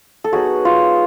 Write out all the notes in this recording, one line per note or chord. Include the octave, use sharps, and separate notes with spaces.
A4
F#3 B3 D#4 F#4 G#4
F4